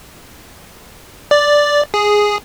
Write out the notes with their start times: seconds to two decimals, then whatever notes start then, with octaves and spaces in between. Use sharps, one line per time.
1.31 D5
1.94 G#4